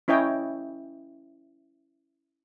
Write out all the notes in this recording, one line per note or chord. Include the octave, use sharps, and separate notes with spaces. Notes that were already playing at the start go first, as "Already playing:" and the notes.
C#4 E4 C#5 D#5 G5